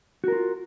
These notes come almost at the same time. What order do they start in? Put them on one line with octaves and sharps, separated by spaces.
F#4 A#4 F4